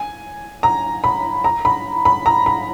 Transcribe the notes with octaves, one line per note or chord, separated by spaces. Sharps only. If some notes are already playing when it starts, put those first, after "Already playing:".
Already playing: G#5
A#5
B5
A#5
B5
B5
A#5
B5